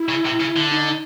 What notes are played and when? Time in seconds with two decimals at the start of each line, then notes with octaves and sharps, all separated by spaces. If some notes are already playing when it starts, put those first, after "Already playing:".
Already playing: E4
0.09 C#3
0.25 C3
0.40 C#3
0.56 D3
0.72 D#4